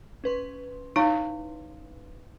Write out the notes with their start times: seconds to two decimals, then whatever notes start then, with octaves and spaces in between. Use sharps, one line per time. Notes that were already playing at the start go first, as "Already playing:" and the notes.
0.24 C#4 B4 C6
0.96 D#4 E4 C#5 F5